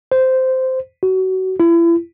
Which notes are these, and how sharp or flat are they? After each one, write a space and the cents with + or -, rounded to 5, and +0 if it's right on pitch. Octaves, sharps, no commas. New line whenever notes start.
C5 -10
F#4 +25
E4 +35